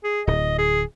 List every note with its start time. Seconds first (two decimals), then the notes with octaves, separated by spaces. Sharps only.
0.04 G#4
0.27 D1 D#5
0.59 G#4